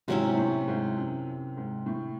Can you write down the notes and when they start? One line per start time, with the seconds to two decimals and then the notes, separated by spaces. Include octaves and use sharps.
0.08 G#2 C3 F#3 C#4 E4
0.38 A2
0.68 G#2
0.97 F#2
1.27 F#2
1.57 G#2
1.86 A2